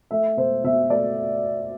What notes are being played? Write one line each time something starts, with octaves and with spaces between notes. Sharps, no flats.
A3 E5
B2 C5
B2 E5
A3 D5